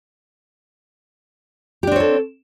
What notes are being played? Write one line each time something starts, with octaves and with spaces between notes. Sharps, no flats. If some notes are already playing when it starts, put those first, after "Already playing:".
C4 D4 G4 A4 C#5